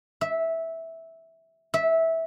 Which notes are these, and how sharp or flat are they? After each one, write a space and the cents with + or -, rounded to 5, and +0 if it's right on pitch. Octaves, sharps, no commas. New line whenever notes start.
E5 -10
E5 -15